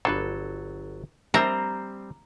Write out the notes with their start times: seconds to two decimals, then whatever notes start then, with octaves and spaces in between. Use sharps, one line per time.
0.05 G1 F#3 D4 F4 A4 B4
1.34 G3 C4 A#4 C5 E5 A#5